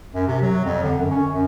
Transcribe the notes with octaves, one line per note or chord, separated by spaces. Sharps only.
F#2
C3
F#3
F2
D3
F#2
C#4
F#2